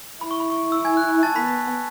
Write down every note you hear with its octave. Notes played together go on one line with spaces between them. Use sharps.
E4 B5
C#6
B5
C#6
E6
G#5 G#6
F#6
A5 A6
B3 B5 B6